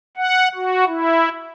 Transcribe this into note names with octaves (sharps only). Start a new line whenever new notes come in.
F#5
F#4
E4